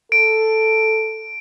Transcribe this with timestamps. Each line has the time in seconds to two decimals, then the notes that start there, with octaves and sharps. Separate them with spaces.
0.12 A4 D7